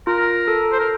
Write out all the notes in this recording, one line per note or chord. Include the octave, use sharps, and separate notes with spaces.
F4 A#4
A4
C5
A#4